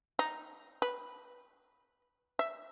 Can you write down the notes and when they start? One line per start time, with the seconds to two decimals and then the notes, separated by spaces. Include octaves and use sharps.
0.19 D#4
0.82 B4
2.39 E5